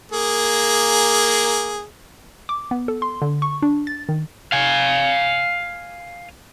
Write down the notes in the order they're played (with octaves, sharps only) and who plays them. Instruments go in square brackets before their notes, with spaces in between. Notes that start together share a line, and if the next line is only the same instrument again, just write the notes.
[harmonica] A#3 G#4
[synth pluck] D6
B3
A4
C6
D3
C#6
D4
A6
D#3
[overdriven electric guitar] F5 G#5